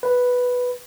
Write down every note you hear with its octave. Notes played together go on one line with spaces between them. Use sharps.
B4